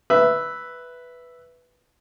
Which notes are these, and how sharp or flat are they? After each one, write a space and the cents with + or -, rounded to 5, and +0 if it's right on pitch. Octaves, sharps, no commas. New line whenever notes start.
B4 +0 E5 +0